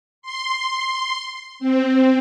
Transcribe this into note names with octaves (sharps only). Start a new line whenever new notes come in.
C6
C4